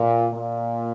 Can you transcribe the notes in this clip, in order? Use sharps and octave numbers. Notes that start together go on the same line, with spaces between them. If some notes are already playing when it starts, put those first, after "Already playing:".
Already playing: A#2
A#2